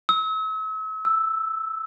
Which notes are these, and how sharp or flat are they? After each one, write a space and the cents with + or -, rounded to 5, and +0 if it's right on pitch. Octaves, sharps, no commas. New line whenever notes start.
E6 -40
E6 +0